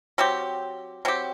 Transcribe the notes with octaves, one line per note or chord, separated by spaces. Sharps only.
F#3 C4 G4
F#3 C4 G4